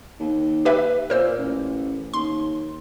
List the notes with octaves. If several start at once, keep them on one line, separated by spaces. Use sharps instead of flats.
D#2
G4 B4 E5
A#2 A#4 C5 E6
A1
D#2 C6